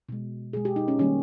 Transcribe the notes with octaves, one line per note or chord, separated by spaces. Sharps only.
B2 G#3
B2 G#3 G#4
G4
D#4
C#4
D#3 G3 A#3 C#4